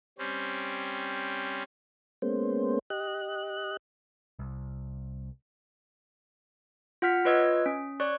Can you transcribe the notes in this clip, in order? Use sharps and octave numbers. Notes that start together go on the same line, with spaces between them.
G3 C4 C#4
G#3 A#3 B3 C#4 C5
G4 D#5 F#6
C2
F4 F#5 F6 B6
F4 B4 C#5 D#5 E6 G#6
C#4
C#5 D5 C#6 F#6